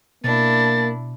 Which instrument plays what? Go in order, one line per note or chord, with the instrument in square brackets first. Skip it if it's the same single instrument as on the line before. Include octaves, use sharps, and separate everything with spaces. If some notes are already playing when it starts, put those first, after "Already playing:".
[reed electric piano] B2 [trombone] A#3 [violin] D4 E4 [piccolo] A6